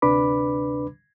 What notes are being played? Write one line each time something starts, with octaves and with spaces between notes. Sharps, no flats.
D2 C3 D4 B4 B5 D6